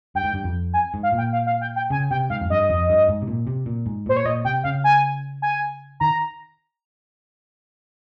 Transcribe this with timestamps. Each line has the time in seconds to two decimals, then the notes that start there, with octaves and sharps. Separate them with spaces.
0.15 G2 G5
0.24 G#2
0.34 G2
0.44 F2
0.74 G#5
0.94 G#2
1.03 F5
1.13 A#2
1.18 G5
1.33 F5
1.47 F5
1.61 G5
1.76 G5
1.90 C#3 G#5
2.11 C3 G5
2.30 G#2 F5
2.41 F2
2.50 G2 D#5
2.70 F2
2.89 G2
3.09 G#2
3.22 C3
3.27 A#2
3.47 C3
3.66 A#2
3.86 G#2
4.06 A#2 C5
4.17 C#5
4.25 A#2 D#5
4.45 C3 G5
4.64 C#3 F5
4.84 G#5
5.42 G#5
6.00 D#3 A#5